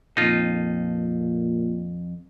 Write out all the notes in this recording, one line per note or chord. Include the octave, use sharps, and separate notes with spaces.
F2 A#2 D#4 F4 A4